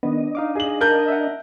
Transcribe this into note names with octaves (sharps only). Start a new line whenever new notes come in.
D#3 B3 D4 D#5
D#4 F5 D6
G#4 F#7
A#4 A5 G6
E5 F#5